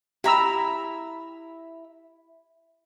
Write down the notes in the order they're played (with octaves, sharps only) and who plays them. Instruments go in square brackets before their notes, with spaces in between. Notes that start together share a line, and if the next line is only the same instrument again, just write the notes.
[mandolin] E4 B5 [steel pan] G4 A#5 E6